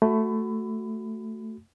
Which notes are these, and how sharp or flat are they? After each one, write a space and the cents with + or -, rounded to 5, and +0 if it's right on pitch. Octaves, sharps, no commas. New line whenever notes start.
A3 +0 F#4 +0 B5 +25